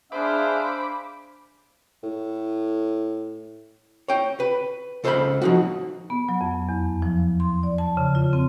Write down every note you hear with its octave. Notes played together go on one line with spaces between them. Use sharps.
D4 G#4 C5 E5 F5 B5 D6
A2
C#5 G5
B4
C#2 A4 C5 C#5 F5 B5
F3 D#4 F#4
B3
F#3
F2
E2
F3
C6
D5
A5
C#3
F4
C4